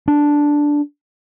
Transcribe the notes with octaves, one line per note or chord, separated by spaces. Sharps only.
D4